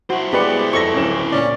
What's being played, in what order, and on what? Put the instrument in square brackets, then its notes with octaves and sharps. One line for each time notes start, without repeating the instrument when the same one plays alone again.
[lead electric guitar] E4 C5 [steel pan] F#4
[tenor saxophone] G#3 [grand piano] B3 D5 C#7 [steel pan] G4 B4
[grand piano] F2 A4 A#6 [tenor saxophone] C4 [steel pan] C#6
[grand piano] D1 C#4 E7 [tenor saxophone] C4
[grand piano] A#2 D5 [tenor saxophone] C#4